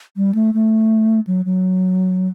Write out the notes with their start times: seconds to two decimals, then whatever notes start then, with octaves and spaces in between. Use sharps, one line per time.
0.17 G3
0.35 A3
0.54 A3
1.27 F#3
1.45 F#3